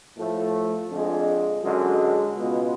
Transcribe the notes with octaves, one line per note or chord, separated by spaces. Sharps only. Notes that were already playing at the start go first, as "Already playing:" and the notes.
A2 F3 A3
F2 D3 G#3
F#2 D3 G#3
C#2 B2 G#3 B3 F4